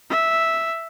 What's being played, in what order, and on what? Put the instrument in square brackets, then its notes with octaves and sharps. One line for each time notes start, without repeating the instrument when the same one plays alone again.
[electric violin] E5